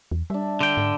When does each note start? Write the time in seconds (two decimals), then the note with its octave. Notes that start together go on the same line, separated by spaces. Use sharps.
0.12 E2
0.30 G3 D4 E5
0.61 D3 G5
0.77 G#2